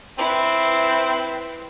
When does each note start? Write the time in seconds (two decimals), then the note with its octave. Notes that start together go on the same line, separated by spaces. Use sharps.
0.19 C4 E4 B4